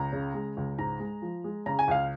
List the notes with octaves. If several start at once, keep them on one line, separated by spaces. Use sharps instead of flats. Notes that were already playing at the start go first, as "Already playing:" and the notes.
Already playing: C#2 A#5
C#3
G#3
C#2
G#2 A#5
G#3
F3
G#3
C#3 A#5
G#5
C#2 F5